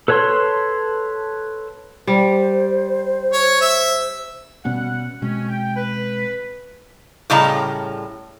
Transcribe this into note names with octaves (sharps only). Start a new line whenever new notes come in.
A4 B4 C#5 A5 C6
G3 C5
C#5
E5
B2 G3 B3 C#4 F#5
B2 G#3 C4 C#4
G5
B4
A2 C#3 G3 D#5 A5 A#5